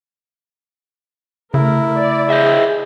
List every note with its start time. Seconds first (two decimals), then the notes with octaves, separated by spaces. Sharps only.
1.54 C#3 A3 E4 A#4
1.97 D5
2.30 G#4 C5 D#5 E5